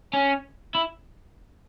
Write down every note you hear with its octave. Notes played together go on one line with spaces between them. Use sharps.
C#4
E4